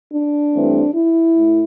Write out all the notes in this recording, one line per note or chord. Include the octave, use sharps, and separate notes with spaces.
D4
G2 E3 A3 C4
E4
A2